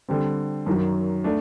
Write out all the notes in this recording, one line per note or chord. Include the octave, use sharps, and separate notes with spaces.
D3 G3 C4
F#2 D#3 F#3
A3 D4